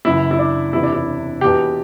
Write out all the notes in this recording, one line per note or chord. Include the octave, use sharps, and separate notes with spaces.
F#1 F#2 E3 E4
E4
D4
E1 E2 C3 E4
D4
E4
E1 E2 B2 G4